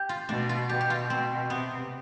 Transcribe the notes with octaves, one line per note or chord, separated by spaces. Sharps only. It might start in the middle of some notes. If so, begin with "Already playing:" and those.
Already playing: G4
F4
B2 D4
F4
B2 G4
G4
F4
B2 C4
C3 B3